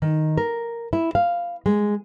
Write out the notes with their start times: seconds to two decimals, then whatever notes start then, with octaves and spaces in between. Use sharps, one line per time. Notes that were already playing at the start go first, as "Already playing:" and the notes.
0.02 D#3
0.38 A#4
0.93 E4
1.15 F5
1.66 G#3